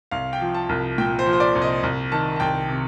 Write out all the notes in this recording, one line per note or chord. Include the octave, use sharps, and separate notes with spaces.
C2 F5
G5
F3
A5
C2
A#2 G5
C5
F3
C5
D5
C2
D#5
C2
D#3 A5
A5
C2 G5
C3